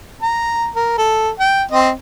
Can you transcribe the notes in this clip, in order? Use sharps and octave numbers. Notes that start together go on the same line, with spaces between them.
A#5
A#4
A4
G5
C4 D#5